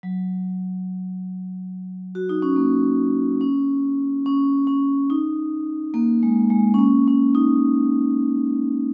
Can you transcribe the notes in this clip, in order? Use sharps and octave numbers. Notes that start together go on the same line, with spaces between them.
F#3
F#4
D#4
C#4
A#3
C#4
C#4
C#4
D#4
A#3
G#3
G#3
C#4
A#3
C#4
D#4